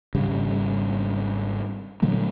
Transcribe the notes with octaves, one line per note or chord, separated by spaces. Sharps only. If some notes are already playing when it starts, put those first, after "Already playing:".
G#1 C#3 G3
A#2 D3 F#3 A3